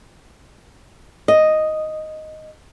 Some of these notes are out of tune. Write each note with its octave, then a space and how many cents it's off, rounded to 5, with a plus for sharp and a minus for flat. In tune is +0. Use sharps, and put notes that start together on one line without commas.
D#5 +0